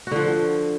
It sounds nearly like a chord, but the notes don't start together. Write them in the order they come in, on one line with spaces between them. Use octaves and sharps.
F#4 D3 F3